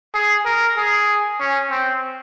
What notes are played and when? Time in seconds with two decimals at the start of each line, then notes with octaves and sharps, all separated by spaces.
0.14 G#4
0.45 A#4
0.77 G#4
1.40 C#4
1.70 C4